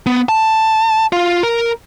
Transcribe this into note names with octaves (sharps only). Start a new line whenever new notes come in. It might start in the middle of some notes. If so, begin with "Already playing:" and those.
B3
A5
F4
A#4